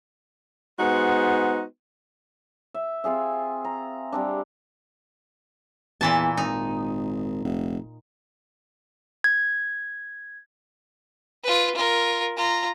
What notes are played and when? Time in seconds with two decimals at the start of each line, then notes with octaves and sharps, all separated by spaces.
0.79 G#3 B3 D#4 F#4 C5
2.74 E5
3.04 C4 F4 G#4 E5
3.64 A#5
4.12 G3 C4 D4
6.01 E2 A#2 E3 A5
6.37 G#1 D#4
7.45 F1
9.24 G#6
11.43 F4 B4
11.75 F4 A#4
12.37 F4 A#5